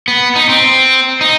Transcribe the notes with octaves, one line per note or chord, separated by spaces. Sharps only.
B3
D#4
C4
D#4